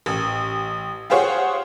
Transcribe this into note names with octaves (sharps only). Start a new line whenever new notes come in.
A1
F4 G4 G#4 C5 C#5 F#5